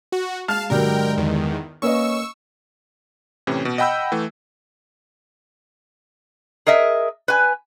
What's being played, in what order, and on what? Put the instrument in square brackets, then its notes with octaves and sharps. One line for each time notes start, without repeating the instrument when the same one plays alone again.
[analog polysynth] F#4
[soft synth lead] G#3 [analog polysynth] F5 A5 [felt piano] F6
[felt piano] G2 D3 F#3 [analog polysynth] A#4 G5
[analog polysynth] E2 D#3
[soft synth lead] A#3 [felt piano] C#4 B4 D#5 [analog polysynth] C#6 E6
[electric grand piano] A2 C3 E3 C#4
B2
D#5 F#5 G5 B5 E6 G6
E3 A3
[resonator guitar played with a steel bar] G#4 A#4 D#5 E5
B4 G#5